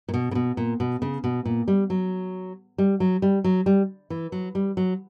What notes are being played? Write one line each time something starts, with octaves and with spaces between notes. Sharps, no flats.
A#2
B2
C#3
B2
A#2
B2
C#3
B2
A#2
G3
F#3
G3
F#3
G3
F#3
G3
E3
F#3
G3
F#3